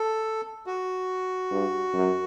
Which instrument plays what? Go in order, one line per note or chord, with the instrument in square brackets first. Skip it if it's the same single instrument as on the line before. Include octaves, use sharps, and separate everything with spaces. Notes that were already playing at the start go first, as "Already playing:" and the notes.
Already playing: [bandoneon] A4
F#4
[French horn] G2
F#2